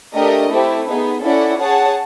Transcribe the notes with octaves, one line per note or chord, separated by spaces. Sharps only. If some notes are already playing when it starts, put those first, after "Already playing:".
A3 D4 G4 A#4 D#5
A3 C4 E4 G4
B3 D#4 G#4 B4
C#4 E4 A4 D5 F#5
G#4 C#5 F#5 A5